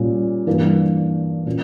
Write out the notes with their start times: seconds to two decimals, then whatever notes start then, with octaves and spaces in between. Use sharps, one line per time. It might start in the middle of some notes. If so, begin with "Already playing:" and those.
Already playing: A#2 G3 C#4
0.47 G2 E3 A#3 E4
1.46 A#2 A#3 C#4